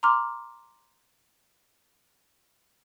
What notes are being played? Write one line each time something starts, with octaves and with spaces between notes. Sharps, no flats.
A#5 C6 D6 F6